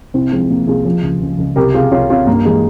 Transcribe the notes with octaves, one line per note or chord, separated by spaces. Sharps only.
C2 C4 E4
F3 G#3 C4
C2 A#3
C2 F4 G#4
F3
C#2
C#2
C#2
C2 G4 A#4
C2 F4 G#4
C2 C#4 F4
C3 C#4 F4
G2 A#3
E3 G#3